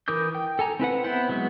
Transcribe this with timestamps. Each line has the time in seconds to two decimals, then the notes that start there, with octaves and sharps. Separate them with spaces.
0.08 E3 A#4 D6 D#6 G6
0.35 G5
0.59 A4 G#5 A#5
0.80 C4 E4 B4 F#5
1.04 B3 E4 C5 F#5
1.29 F#3 G#3 B3